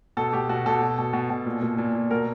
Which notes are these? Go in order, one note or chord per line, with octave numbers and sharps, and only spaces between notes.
B2 A4
B2 G4
B2 F#4
B2 A4
B2
B2
B2
B2
A#2
A#2
A#2
A#2
B2 A#4